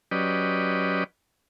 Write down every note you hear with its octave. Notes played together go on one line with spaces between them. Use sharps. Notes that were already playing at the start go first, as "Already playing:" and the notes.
F#3 C#4 G4 B4 D5 D#5